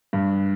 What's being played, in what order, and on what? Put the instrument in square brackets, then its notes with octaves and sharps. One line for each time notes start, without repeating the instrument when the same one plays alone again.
[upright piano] G2